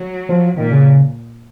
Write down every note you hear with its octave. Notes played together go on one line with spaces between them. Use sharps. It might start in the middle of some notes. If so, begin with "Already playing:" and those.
Already playing: F#3
F3
A#2 D#3
C#3